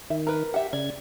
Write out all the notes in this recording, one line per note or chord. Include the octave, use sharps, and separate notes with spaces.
D#3 E5
A#4 B4
G4 E5 F#5
C#3 D5 G#6